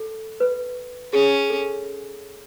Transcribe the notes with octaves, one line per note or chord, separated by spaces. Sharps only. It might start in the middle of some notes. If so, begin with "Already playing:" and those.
Already playing: A4
B4
C#4 G#4
A4